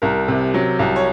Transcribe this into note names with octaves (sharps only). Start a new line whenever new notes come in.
C2 A#4
C3
F#3
C2
C#5